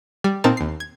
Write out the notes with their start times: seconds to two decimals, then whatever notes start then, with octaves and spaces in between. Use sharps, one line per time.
0.24 G3
0.44 A#2 C4 D#4 A#4 A5 A6
0.57 D#2 C7
0.80 G#6